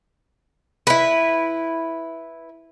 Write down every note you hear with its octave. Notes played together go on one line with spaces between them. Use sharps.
E4 B4